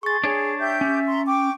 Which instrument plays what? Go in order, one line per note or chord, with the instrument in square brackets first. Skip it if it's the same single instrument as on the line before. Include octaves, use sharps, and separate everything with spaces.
[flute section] G#4 C6 [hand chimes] C#6 A6
[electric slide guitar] D4 C#5 [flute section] G#4
[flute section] G4 G6 [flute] E5
[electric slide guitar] C#4
[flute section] A#5 C6
[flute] G5 [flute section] C#6 D6